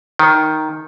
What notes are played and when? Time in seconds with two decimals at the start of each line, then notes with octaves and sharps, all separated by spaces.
0.19 D#3